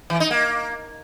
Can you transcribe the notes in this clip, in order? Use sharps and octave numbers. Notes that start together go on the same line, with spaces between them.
E3
D#4
A#3